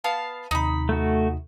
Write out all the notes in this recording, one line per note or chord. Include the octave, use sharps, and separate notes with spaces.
B3 F5 A5
D#2 C3 D#4 B5
A3 F#4